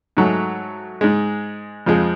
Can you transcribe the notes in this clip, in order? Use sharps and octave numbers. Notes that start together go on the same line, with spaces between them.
G#2 F#3 A3
G#2 G#3
F2 F3 G#3